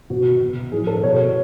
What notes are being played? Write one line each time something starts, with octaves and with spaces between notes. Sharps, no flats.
B2 F#4
B2
A2 F3 G#4
A4
B2 C#5